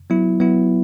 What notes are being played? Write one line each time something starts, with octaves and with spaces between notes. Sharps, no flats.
F#3 B3 E4
F#3 B3 E4